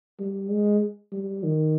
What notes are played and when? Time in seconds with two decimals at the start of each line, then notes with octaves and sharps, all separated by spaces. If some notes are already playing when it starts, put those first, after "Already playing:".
0.19 G3
0.50 G#3
1.12 G3
1.43 D#3